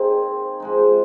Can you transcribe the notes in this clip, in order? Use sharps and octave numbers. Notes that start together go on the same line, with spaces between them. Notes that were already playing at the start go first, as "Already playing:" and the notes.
Already playing: D#3 A#3 C4 D#4 G#4
F3 G#3 D#4